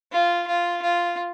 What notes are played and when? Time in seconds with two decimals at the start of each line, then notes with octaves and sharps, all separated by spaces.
0.12 F4
0.47 F4
0.82 F4